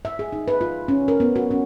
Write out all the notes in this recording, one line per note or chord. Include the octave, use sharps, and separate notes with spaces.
E5
G#4
D#4
B4
F4
C#4
A#4
B3
F#4
C#4